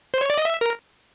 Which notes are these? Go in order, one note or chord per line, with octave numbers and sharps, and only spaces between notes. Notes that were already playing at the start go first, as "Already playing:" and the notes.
C5
C#5
D5
D#5
E5
A#4